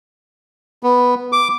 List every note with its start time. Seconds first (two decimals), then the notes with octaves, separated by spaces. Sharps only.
0.83 B3
1.32 D6